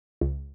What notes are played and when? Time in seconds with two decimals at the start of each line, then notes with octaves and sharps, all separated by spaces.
0.21 C#2